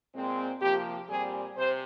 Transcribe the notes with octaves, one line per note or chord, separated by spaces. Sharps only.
A#2 G#3 C4
C3 F3 A#3 G4
A#2 G3 C4 G#4
C3 C5